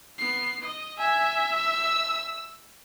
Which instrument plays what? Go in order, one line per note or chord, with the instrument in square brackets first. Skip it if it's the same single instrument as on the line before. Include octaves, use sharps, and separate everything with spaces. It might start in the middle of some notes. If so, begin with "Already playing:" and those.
[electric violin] B3 C7
D#5
[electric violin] E5 [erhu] G#5
[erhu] E6